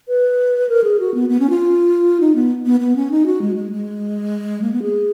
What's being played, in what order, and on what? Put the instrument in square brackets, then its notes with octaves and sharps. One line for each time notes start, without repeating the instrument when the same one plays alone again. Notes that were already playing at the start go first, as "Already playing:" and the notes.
[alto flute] B4
A#4
G#4
F#4
B3
B3
C#4
F4
D#4
B3
B3
B3
C#4
D#4
F#4
G#3
G#3
G#3
A#3
B3
G#4